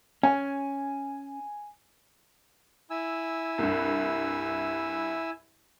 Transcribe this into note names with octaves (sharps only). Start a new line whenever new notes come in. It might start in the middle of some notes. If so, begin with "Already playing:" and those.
C#4 G#5
E4 G#5 E6
C2 G2